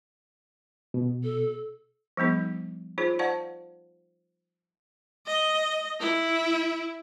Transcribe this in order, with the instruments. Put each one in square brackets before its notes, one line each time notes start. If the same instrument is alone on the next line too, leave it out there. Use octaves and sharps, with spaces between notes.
[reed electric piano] B2
[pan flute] A4
[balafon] F3 G3 B3 D#4 G#4
D#4 F4 G#4 C5 C#5
C5 D5 F5 F#5 A5 C#6
[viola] D#5
E4